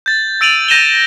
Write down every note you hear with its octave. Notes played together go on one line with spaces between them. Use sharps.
G6 A6
E6 A6 D7 D#7 F7 F#7
G6 A#6 D#7 E7 F#7 G7